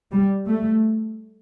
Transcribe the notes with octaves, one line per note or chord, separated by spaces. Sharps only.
G3
A3